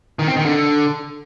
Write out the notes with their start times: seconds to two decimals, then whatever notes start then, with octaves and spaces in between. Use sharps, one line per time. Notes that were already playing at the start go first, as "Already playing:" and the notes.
0.19 D#3
0.28 C4
0.37 D#3
0.45 D3